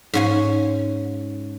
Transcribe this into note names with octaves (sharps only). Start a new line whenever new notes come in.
G#2 C#4 G#5